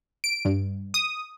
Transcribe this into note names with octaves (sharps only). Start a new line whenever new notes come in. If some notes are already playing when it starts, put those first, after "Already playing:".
D7
G2
D#6